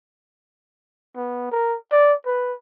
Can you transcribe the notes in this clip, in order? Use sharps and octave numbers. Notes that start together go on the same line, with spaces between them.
B3
A#4
D5
B4